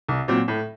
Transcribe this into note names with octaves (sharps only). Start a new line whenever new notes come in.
C2
A#2 F#3 C4
A2